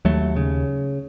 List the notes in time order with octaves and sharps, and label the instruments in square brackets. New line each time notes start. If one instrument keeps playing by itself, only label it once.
[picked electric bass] D#2 F#3 A3
C#3